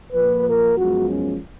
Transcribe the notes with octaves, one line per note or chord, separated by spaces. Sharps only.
A#2 F3 A#3 B4
A#4
F#2 F3 G#3 B3 F#4
C#4